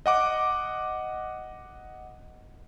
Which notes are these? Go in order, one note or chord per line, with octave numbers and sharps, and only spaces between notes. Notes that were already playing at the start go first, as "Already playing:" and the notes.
D#5 F#5 D6